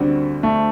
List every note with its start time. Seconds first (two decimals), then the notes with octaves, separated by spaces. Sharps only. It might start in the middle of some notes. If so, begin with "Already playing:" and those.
Already playing: D2 D3 G3 C4 F#4
0.43 A3